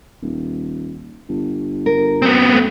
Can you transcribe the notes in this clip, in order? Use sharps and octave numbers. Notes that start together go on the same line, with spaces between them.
D#1
G1
A#4
F#2 B3 C4
A3